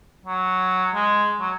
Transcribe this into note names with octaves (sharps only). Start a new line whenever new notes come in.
F#3
G#3
F#3